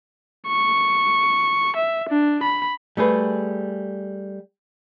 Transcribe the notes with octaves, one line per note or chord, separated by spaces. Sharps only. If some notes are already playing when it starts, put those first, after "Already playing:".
C#6
E5
D4
B5
G3 A3 G#4 B4